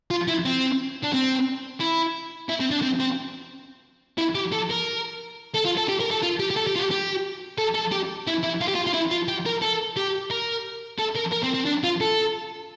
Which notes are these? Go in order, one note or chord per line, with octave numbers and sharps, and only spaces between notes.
F4
E4
C4
D4
C4
E4
E4
C4
D4
C4
C4
E4
G4
A4
A#4
A4
F4
A4
G4
A#4
A4
F4
G4
G4
A4
G4
F4
G4
G4
A4
A4
G4
E4
E4
F4
G4
F4
F4
E4
F4
G4
A#4
A4
G4
A#4
A4
A#4
A#4
C4
C4
D4
F4
A4